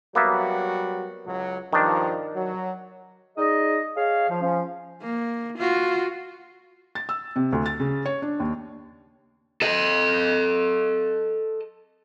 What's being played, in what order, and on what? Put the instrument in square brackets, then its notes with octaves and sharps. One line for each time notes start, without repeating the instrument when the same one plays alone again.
[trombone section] F#3 G3 F#4 [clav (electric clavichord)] A#3 B3 E5
[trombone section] C#2 F#3
[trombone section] G2 F3 [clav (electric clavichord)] D#3 D4
[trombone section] F#3
[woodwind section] D#4 G#4 D5 D#5
G#4 C#5 D#5 F5
F3
F3 C#4
[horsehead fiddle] A#3
F4 F#4
[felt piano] A6
E6
C3
D2
A6
C#3
C#5
D4
D#2
[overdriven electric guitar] A4 D#5